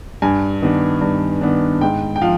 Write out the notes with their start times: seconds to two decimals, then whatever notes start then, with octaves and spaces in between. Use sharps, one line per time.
0.22 G2 G#5
0.62 D#3 B3 D4
1.01 G2
1.41 D#3 B3 D4
1.81 G#2 G5
2.16 G5
2.21 F3 F5